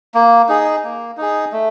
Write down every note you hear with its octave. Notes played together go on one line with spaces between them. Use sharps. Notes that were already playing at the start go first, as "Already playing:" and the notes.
A#3
D#4 G#4
A#3
D#4 G#4
A3